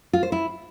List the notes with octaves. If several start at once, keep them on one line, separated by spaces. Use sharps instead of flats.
F4
C5
E4